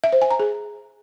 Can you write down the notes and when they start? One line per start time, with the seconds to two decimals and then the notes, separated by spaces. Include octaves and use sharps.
0.04 E5
0.13 C5
0.22 G#5
0.31 A#5
0.40 G#4